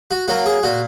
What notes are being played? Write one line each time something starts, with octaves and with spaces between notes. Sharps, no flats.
F#4
F#3 A#3 F#4
G#4
A#2 F#4